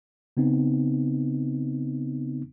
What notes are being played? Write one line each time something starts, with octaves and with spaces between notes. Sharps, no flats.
C#3 B3 C4 D#4